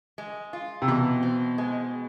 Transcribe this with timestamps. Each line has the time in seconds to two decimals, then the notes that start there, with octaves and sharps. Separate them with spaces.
0.18 G#3
0.53 F4
0.82 C3
0.88 B2 E3
1.23 C4
1.58 G#3